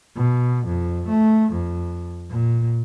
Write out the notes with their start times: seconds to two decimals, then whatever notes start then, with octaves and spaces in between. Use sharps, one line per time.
0.16 B2
0.67 F2
1.09 A3
1.53 F2
2.30 A#2